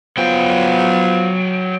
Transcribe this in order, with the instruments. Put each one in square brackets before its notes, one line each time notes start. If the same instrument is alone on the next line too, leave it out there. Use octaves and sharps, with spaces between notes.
[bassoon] F3 [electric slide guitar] F#3 G5 [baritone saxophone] B3